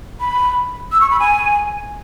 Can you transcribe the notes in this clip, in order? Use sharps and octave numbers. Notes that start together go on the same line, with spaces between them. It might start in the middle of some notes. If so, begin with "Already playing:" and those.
B5
E6
C#6
B5
G#5